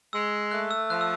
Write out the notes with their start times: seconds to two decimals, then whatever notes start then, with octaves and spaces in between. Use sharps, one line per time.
0.13 G#3 E6
0.51 A3 F#6
0.71 E6
0.90 F3 F#6
1.01 E6